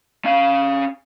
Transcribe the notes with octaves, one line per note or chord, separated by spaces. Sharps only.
C#4 F5